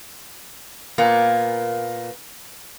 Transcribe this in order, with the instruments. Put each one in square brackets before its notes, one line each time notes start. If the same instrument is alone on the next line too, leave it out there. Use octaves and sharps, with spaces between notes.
[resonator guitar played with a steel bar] A#2 A#3 B3